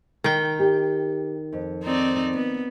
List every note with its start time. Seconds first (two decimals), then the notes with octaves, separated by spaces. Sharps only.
0.24 D#3 G5
0.60 G4
1.52 F2
1.83 C4 D#4 D5
2.34 B3